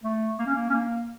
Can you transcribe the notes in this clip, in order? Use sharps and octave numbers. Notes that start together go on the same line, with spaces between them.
A3
A#3
C#4
A#3
C#4
A#3